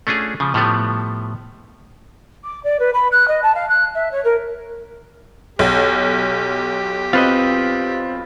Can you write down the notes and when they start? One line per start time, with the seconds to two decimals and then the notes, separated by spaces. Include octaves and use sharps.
0.07 A3 C#4 D4 F4 G#4
0.40 C#3 F3
0.54 A2 F3 G3 A3 B3
2.44 D6
2.64 D5
2.79 B4
2.94 B5
3.12 F#6
3.28 D#5
3.42 A5
3.55 F5
3.69 F#6
3.95 E5
4.11 C#5
4.24 A#4
5.59 B1 G4
7.13 C4 F4 B4 D#5